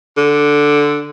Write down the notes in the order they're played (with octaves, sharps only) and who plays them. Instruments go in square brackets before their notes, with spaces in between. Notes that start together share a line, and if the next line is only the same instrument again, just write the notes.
[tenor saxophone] D3